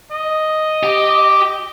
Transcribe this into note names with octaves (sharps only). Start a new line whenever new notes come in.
D#5
G4